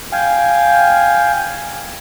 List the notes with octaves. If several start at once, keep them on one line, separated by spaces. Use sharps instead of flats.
F5 G5 G#5